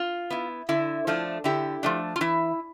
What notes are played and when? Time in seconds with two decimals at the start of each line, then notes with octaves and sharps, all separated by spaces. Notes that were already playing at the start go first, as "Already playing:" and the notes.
Already playing: F4
0.30 B3 E4
0.69 D3 E4
1.07 F3 A3 D4
1.44 D3 E4 G4
1.83 F3 A3 D4
2.16 F4
2.21 E3 E4